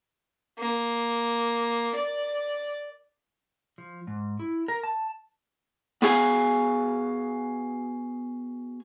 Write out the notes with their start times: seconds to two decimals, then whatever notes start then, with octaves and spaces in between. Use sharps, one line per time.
0.58 A#3
1.96 D5
3.78 F3
4.07 G#2
4.39 E4
4.68 A#4
4.83 A5
6.02 B3 F#4 G#4 F5 G#5